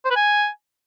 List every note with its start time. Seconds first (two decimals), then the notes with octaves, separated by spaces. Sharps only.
0.05 C5
0.11 B4
0.16 G#5